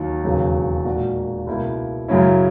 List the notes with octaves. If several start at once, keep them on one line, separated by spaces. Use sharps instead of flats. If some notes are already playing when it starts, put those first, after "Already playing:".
Already playing: D#2 D#3 F#3
E1 D#2 C#3 F#3
A#2 G#3 D#4 F#4
C#2 B2 A#3 E4
F#2 C#3 F#3 C#4 E4